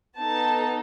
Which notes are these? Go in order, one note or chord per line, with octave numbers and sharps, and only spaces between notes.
B3 D#4 A4 A5